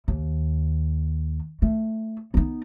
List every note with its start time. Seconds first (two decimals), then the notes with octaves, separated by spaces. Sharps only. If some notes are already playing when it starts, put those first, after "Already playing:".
0.08 D#2
1.62 A3
2.34 B3 D#4